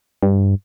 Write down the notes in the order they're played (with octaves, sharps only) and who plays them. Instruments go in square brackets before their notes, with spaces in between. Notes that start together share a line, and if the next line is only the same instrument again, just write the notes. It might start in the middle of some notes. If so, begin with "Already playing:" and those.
[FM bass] G2